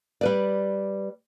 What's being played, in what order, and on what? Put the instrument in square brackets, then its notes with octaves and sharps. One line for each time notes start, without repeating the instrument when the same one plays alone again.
[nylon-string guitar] G3 B4 D5